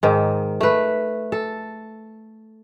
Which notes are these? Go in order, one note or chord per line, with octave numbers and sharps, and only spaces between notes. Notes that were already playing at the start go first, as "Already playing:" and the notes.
G#2 D#3
A3 B4
A4